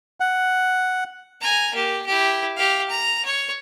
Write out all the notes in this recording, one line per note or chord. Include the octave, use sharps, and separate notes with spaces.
F#5
G#5 A#5
A#3 G4
E4 G4
G4 F5
A#5
C#5